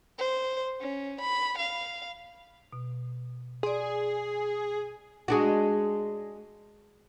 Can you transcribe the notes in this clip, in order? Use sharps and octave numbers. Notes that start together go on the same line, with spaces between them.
C5
C#4
B5
F5
B2
G#4 D5 C6
G#3 D4 F#4